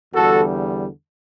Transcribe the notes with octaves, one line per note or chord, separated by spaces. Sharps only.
E2 D3 G3 F#4 A4